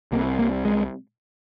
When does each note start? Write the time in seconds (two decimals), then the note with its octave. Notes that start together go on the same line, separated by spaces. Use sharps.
0.12 C2 A#3
0.16 C3
0.39 A#3
0.65 G#3